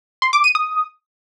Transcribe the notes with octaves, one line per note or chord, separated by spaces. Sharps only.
C6
D6
D#7
D#6